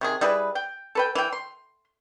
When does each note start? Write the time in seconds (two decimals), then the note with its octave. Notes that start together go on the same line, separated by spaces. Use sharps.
0.01 C3 D#3 G#4
0.21 G3 E4 G#4 B4
0.55 G5
0.95 A4 B4 G5
1.15 E3 G5
1.33 C6